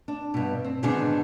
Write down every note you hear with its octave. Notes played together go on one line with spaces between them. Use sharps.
D4
G2 B2
C4
G#2 B2 D3 D#3 D4 G#4